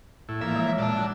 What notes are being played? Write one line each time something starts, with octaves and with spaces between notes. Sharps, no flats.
A2 E4
E3 F3 A#3 E5
G#3 C#5
A#2 D5 A5 E6
F#3 D4